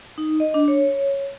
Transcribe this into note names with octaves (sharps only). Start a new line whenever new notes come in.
D#4
D#5
D4
C#5